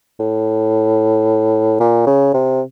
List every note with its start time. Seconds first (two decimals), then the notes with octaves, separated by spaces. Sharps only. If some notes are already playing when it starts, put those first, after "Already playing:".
0.20 A2
1.80 A#2
2.07 C#3
2.34 C3